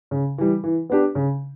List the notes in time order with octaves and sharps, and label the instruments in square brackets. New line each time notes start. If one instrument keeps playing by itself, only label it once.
[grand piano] C#3
E3 G3
E3
B3 D4 G4
C#3